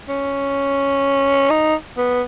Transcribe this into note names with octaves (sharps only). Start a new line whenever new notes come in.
C#4
D#4
B3